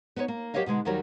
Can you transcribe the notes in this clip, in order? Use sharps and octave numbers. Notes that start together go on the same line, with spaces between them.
B3 D#4 B4 C#5
A#3
F#3 G4 A#4 C#5 D#5 F5
B2 D3 G#3 D#4
D#2 D#3 F#3 G3 A#4 C#5